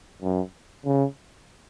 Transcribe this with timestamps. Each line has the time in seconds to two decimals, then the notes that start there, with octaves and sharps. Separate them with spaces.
0.22 F#2
0.85 C#3